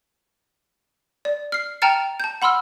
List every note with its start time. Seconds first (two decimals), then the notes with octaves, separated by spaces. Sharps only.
1.25 D5
1.52 F6 C7
1.82 G5 A5 A#5 F6 A6 C#7
2.20 A5 G6
2.42 F#5 B5 C6 E6 F6